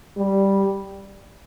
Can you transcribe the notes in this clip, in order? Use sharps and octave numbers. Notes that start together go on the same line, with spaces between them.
G3